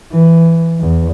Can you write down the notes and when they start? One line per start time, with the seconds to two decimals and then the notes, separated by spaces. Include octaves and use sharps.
0.12 E3
0.80 E2